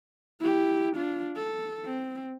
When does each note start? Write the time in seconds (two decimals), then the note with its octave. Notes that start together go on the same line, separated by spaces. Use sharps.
0.40 E4 G4
0.96 D4 F4
1.36 A4
1.85 C4